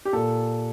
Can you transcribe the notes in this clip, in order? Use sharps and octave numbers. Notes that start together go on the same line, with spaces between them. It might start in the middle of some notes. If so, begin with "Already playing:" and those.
G4
A#2 A4